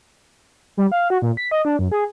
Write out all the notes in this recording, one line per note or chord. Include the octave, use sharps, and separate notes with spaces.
G3
F5
F#4
A#2
B6
D#5
D4
F#2
G#4